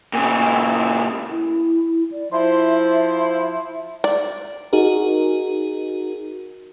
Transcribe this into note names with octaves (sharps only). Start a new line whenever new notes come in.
A#2 C#3
E4
D5
F3 E4 C5 E5
D5
D#4 F#4 G#4 A#4